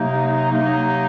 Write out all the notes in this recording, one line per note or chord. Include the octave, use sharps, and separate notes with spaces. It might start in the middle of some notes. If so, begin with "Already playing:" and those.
Already playing: C3 F#3 A#3 D#4
C3 F#3 A#3 D#4